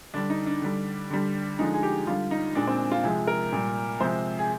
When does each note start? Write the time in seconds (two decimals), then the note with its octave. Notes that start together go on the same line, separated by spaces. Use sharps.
0.14 D3 G3 D4
0.30 D#4
0.46 D4
0.62 D3 G3
1.10 D3 G3
1.59 D3 F3 G#3 D#4
1.74 G#4
1.83 G4
2.07 D3 G3 F4
2.31 D#4
2.55 A#2 G#3 D4
2.67 C4
2.79 D4
2.92 F4
3.04 C3 F3 G#3 G#4
3.27 A#4
3.52 A#2 G3
4.00 C3 F3 G#3 C5
4.39 G#4